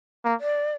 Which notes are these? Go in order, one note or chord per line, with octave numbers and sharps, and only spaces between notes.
A#3
D5